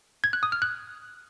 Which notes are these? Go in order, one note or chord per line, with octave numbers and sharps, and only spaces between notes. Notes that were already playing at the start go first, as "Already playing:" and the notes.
G#6
F#6
D#6
F6
F#6